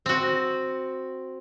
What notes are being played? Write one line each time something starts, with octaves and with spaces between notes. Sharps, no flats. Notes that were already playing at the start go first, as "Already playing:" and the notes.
C4 F#4